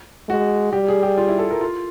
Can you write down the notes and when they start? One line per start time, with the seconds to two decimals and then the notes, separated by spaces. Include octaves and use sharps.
0.29 G#3 F#4
0.73 G3 G4
0.88 G#4
1.03 G4
1.18 F4
1.28 E4
1.39 A4
1.51 A#4
1.61 F4